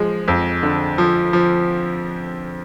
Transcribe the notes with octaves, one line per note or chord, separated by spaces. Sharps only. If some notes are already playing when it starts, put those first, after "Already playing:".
Already playing: F3 G#3
F2
D3
F3
F3